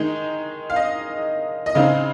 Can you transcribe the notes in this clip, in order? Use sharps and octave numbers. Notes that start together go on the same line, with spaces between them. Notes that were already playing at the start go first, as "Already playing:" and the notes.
Already playing: D#3 G#3 D#4
F5
D#5
D#5
C#3 G#3 C4 D#4 F5